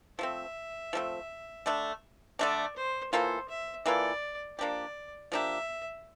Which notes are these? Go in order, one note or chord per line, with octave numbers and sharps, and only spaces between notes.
F3 A3 C4 E5
F3 A3 C4
D3 A3 D4
D3 A3 D4 D5
C5
E3 A#3 F4 A4 C5
E5
E3 A#3 F4 A4 D5
F3 A#3 D4 G4 D5
F3 A#3 D4 G4 E5